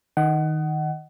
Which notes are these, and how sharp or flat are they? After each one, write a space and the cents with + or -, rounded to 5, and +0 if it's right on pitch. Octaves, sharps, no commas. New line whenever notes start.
D#3 +0 D#5 +0 F#5 +25